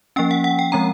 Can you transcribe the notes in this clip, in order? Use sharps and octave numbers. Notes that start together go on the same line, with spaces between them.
F3 A#3 C#4 G5
F#5
F#5
G5
F3 G#3 C4 A#5